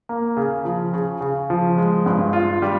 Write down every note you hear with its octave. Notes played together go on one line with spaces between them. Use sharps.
A#3
C#3
F3
C#3
C#3
F3
G#3
G2
F4
G3